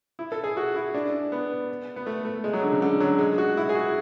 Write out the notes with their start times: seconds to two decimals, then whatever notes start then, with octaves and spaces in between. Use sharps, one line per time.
0.19 E4
0.32 A4
0.44 G#4
0.57 F#4
0.76 E4
0.94 D4
1.32 B3
1.96 B3
2.06 A3
2.25 A3
2.44 G#3
2.53 F#3
2.63 D3
2.72 C#3
2.82 D3
3.00 F#3
3.19 G#3
3.38 F#4
3.57 E4
3.69 G#4
3.75 F#4